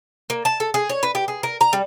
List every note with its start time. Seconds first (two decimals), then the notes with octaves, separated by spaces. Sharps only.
0.30 A#3
0.45 A5
0.60 A4
0.74 G#4
0.90 C#5
1.03 B4
1.15 G4
1.28 G#4
1.43 A#4
1.61 A#5
1.73 G3